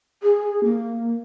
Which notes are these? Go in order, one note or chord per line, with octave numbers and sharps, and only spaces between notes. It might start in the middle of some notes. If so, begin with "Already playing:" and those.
G#4
A#3